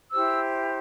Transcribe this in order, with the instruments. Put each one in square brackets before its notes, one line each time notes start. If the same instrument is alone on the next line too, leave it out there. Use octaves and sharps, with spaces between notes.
[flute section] E4 G4 C5 E6